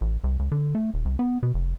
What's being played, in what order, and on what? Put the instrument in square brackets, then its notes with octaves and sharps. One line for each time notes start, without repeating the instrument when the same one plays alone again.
[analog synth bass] A1
C2
C#2
D3
A3
D#1
C2
B3
B2
F1